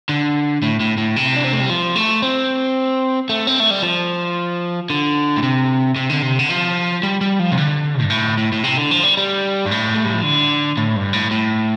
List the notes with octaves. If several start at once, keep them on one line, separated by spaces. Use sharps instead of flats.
D3
A2
A2
A2
C3
D4
C4
A3
G3
F3
A3
C4
A3
C4
A3
G3
F3
D3
A2
C3
C3
D3
C3
D3
F3
G3
G3
F3
C3
D3
G2
A2
A2
A2
C3
D3
F3
G3
G3
G2
A2
A3
G3
F3
D3
A2
G2
A2
A2